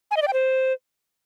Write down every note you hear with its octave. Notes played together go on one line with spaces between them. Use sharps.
G#5
D#5
D5
G5
C5